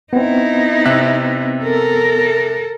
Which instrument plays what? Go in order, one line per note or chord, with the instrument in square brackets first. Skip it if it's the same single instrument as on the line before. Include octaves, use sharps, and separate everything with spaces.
[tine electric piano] B3 C4 [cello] D#4 E4
[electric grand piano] C3 E5 F#6
[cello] A4 A#4